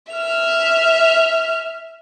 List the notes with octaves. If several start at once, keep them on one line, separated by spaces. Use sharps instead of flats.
E5 F6